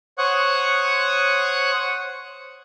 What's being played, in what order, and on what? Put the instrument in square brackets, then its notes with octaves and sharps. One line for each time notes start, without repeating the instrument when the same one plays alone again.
[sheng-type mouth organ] C5 C#5 F#5 C#6 D#6 F#6